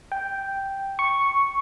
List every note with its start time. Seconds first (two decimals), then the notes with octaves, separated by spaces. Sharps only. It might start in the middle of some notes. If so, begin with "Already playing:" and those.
0.12 G5
0.99 C#6